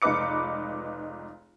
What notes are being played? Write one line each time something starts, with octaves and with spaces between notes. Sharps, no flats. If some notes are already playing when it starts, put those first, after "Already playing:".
F1 C#2 D#4 B4 D6 C#7